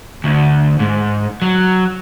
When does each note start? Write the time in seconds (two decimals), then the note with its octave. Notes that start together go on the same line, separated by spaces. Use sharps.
0.24 D2
0.79 G#2
1.42 F#3